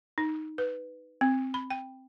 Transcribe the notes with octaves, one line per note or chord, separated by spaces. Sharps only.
D#4
B4
C4
B5
G5